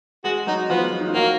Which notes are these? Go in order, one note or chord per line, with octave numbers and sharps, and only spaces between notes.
G#3 F#4 G#4
F#3 D#4 F#4
F3 B3 F4
D#4
F4
F#3 A#3 F#4